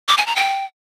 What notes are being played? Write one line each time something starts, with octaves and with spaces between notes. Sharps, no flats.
D6
G#5
A#5
G5